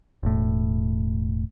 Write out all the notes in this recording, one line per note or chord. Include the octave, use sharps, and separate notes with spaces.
E1 A2